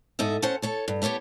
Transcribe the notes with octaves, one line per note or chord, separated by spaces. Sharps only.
G#2 A4 D#5 E5
C#4 C5 F#5 A5
A4 C#5 A5
G2
B3 G4 C#5 E5 A5